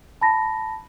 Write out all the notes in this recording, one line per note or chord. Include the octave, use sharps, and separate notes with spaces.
A5 B5 A#6